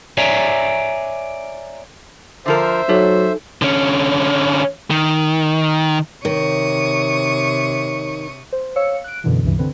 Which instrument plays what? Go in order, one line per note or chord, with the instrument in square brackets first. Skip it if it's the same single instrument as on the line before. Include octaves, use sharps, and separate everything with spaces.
[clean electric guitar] C#5 D5 E5 G#5 A#5
[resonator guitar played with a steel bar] D3 F3 A#4 [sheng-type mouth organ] C5 E5
[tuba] F#3 [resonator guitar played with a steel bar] A3 [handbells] D#4 A4
[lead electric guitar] D3 C#4
D#3
[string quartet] C3 C#6 D#6 [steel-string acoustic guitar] D#3 [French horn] C#5
[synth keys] C5
C#5 F5 E6 C#7
F#6 D7
F#2 B2 D3 E3
C#2 G2 C3 E3
D3 C4 B4